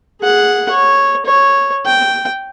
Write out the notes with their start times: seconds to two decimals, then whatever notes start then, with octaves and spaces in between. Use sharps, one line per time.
0.21 G#4 F#5
0.70 C#5
1.26 C#5
1.86 G5